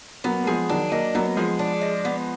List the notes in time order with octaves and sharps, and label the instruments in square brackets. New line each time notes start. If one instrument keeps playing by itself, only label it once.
[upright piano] F#3 A#3 [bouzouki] B3
[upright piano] A#3
[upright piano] F3 G#3 [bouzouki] G#4
[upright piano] D#3 F#3 [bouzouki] D4
[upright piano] F#3 A#3 [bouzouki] D#5
[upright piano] F#3 A#3 [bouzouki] B3
[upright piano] F3 G#3 [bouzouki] G#4
[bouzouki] D4
D#5
B3